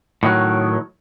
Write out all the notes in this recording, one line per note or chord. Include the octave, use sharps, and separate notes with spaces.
A2 D#3 F#3